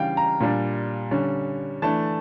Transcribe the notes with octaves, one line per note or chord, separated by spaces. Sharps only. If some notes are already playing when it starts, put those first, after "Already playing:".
Already playing: C#3 E3 G3 D4 F5 G5
A#5
A#2 G3 D4
D3 G3 C#4
E3 A3 D4 A5